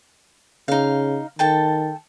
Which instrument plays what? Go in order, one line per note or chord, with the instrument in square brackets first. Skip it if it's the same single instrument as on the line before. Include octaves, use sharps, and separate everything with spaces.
[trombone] C#3 [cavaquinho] D#4 F5
[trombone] D#3 [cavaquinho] A4 G5 A5